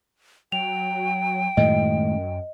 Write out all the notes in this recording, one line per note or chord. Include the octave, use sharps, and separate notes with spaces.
F#3 G5 F7
F#2 A2 D#3 G#3 D#5